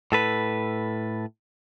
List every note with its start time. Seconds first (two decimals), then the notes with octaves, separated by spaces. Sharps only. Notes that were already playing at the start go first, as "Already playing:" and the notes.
0.12 A2 A4 B4